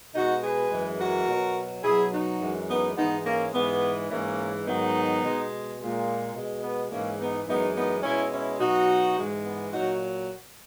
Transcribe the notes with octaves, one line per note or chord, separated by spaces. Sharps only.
B2 G#3 D#4 F#4
G#4 B4
F#2 E3 G#3
F#4 A#4
B2 F#3
B2 F#3 E4 G#4
D#4 F#4
F#2 E3 G#3
B3 D#4
G#2 E3 G#3 B3 D#4
A#3 C#4
G#2 E3 G#3 B3
G#2 E3 G#3 A#3 C#4
G#2 D#3 F#3 B3 D#4
B2 G#3
A#2 G#3
B2 G#3
B3
G#2 E3 G#3 A#3 C#4
B3 D#4
F#2 E3 G#3 B3 D#4
B3 D#4
B2 G#3 C#4 E4
C#4 E4
B2 F#3 D#4 F#4
G#2 E3 G#3
B3
A#2 F#3 D#4 F#4